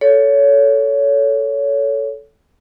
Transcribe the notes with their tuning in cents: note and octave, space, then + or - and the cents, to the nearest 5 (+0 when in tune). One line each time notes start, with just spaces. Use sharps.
A4 +0 C#5 +25